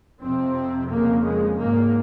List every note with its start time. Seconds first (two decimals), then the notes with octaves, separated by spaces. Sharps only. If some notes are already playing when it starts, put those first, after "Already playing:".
0.23 F2 C3 C4
0.91 F2 C#3 A#3
1.25 G#3
1.60 G#2 A#3